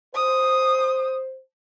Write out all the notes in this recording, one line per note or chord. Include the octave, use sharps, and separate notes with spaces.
C5 D#6